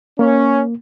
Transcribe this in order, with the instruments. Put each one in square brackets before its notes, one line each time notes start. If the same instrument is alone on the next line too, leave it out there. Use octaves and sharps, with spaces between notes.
[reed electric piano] A#3 [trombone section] C#4